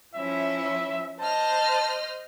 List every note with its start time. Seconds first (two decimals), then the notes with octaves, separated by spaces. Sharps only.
0.15 F3 C#4 E4 E5
1.20 C5 D#5 A5 F6